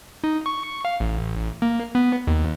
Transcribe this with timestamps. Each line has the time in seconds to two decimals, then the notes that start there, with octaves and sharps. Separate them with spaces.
0.24 D#4
0.46 C#6
0.85 F5
1.00 A1
1.62 A#3
1.95 B3
2.27 D#2